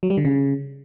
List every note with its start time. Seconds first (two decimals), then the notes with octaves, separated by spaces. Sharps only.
0.03 F#3
0.10 G3
0.17 D3
0.25 C#3